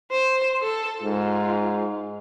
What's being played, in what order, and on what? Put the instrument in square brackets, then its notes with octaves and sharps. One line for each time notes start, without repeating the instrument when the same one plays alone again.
[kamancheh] C5
A4
[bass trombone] G#2 [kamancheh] F4